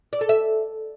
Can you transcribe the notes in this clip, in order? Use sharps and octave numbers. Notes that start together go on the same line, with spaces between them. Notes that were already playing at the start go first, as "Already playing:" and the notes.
D5
A4
E5